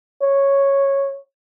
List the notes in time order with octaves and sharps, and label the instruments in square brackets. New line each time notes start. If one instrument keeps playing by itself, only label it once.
[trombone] C#5